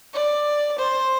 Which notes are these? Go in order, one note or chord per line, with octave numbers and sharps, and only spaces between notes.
D5
C5